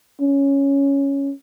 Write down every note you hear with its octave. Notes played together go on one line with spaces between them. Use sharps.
C#4